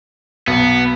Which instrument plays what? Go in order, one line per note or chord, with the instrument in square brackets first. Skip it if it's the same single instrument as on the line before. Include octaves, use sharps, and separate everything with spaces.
[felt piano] B1 [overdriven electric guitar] B3